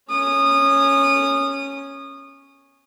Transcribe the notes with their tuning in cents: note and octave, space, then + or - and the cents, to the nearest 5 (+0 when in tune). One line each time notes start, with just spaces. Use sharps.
C#4 -5 D#6 -20